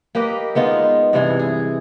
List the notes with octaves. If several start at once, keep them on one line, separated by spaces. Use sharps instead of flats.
A#3 G4 B4 D#5
G#3 B3 D#4 F4
G2 C3 E3 G#4
G#4